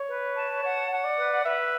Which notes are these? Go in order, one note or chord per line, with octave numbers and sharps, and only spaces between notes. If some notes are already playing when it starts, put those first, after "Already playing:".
Already playing: C#5
B4
A5
C#5 F#5
F#5
D5
B4
B4 E5